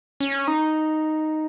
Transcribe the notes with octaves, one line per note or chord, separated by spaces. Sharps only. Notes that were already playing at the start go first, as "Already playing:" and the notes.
C#4
D#4